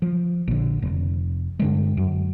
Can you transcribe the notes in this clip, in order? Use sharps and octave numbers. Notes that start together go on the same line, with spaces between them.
F3
A#1 D3
F1
G2 D3 G#3
F#2